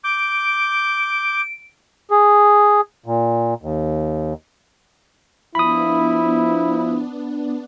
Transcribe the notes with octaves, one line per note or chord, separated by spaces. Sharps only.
D6 G6 D7
G#4
A#2
D#2
F3 B3 D4 E4 B5 D#6